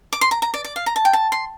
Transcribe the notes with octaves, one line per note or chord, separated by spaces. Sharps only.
D6
C6
A#5
A#5
D5
D5
F5
A#5
A5
G5
A5
C6